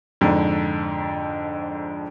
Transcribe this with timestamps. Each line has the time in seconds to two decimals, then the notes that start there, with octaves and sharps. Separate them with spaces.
0.21 F2 G#2 D3